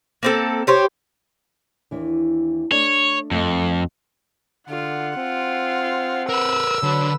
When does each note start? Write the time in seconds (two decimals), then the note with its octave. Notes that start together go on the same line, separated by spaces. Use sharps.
0.23 A#3 C4 A4
0.67 G4 C5 C#5
1.91 D#2 E3 D4
2.72 A3 D4 C#5 D5
3.31 F2 A3 A4 D#5
4.70 D3 F4 F#5
5.17 C4 F4
6.29 A#4 B4 E6
6.83 D3 F#3 B4